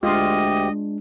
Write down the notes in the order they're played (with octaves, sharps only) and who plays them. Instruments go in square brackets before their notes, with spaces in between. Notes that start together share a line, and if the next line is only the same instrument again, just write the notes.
[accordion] D2 G4 [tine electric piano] G#3 D4 [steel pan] F4 [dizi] D#5